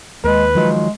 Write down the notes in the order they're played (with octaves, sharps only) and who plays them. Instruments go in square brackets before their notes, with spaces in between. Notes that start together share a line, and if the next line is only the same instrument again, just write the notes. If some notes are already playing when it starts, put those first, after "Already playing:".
[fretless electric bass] D#2 [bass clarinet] G#3 [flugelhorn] B4
[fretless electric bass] D#3 F3 F#3 [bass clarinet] G#3